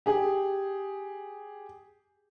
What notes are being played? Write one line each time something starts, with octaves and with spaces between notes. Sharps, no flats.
G4 G#4